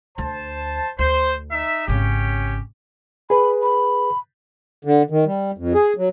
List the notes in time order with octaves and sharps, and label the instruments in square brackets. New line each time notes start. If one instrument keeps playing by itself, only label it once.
[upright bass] D2 [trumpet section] C5 A5
[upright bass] D2 [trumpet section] C5
[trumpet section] D#4 E5
[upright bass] G#1 C#3 [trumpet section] C#4 G4
[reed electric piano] G#4 B4 [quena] B5
[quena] B5
[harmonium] D3
D#3
G3
F2
G#4
F#3